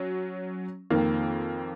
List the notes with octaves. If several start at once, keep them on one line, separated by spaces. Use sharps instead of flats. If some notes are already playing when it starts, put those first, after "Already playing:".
Already playing: F#3 C#4
F2 D#3 A#3 F4